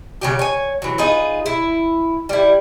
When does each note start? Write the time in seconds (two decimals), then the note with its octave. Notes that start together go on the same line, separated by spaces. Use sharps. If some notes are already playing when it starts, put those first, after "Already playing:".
0.22 C#3 F#3 G4
0.39 C#5 G#5
0.82 E3 F#3
0.98 D#4 F4 G#4 B4
1.46 E4
2.29 G3 E4